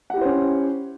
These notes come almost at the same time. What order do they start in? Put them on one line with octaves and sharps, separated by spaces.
F#5 G4 E4 C5 C#4